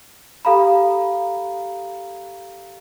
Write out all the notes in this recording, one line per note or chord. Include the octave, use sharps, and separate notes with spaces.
G4 A4 F5 A#5 B5